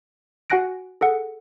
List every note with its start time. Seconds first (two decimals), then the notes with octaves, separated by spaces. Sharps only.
0.50 F#4 F#5 G#5 F#6 A#6 D7
1.01 G#4 A4 F#5